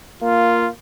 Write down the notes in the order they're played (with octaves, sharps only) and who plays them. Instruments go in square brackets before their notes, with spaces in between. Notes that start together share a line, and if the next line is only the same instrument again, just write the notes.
[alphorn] A#3 [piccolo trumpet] F4